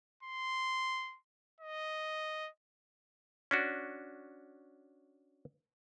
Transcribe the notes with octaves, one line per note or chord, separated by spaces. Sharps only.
C6
D#5
C#4 D4 F#4